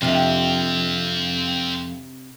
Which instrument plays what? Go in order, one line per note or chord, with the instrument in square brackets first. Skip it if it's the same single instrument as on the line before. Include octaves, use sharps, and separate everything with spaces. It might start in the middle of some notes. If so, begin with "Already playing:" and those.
[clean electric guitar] F2 [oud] C3 D4 G4 [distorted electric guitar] C4 F4